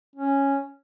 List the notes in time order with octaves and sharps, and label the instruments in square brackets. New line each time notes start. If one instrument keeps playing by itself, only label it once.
[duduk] C#4